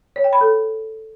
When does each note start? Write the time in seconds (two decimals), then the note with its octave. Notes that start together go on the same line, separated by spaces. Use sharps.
0.16 C#5
0.24 G5
0.33 B5
0.41 A4